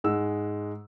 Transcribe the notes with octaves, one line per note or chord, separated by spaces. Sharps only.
G#2 G#3 F#5 E6